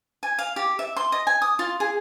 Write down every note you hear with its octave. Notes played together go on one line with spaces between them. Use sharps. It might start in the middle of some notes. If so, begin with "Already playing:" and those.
G#5
F5
G4
E5
C6
D#5
G#5
D#6
F4
G#4